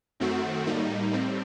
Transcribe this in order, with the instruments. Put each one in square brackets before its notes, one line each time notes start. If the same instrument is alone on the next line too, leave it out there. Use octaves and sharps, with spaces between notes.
[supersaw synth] F#2 D#3 A3 C4 F#4
A2 G3 A#3 D#4
A2 G3 C4